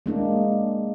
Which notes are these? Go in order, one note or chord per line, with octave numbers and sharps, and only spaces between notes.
G#3 A#3 D4